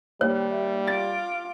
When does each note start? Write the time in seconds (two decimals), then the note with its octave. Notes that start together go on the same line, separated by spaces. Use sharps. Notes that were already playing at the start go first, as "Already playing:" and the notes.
0.21 D#2 G3 C#5
0.51 E5
0.87 F4 D6 A6